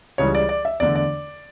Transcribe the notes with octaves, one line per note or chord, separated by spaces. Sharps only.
C#2 C#3 E3 G3 C#5
D5
D5
E5
E2 D3 A3 D5
D5